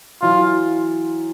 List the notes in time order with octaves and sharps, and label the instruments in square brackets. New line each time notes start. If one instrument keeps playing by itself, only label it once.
[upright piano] E3 F#3 [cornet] F4